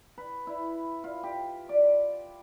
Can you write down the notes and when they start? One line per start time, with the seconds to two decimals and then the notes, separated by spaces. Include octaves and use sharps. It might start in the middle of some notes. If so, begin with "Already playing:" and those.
0.18 B4
0.47 E4
1.04 F4
1.23 G4
1.69 D5